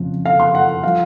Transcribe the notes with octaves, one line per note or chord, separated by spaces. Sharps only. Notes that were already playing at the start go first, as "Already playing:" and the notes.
Already playing: F2 C#3 F3
F5
C6
F#5
F3 F5